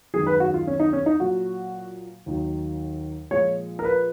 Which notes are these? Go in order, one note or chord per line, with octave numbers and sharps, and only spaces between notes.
F#2 D#3 G#3 G#4
B4
F#4
F4
C#4
D#4
C#4
D#4
A#2 F#3 F#4
D#2 D#3 F#3
A#2 F3 G#3 C#5
A#4
B4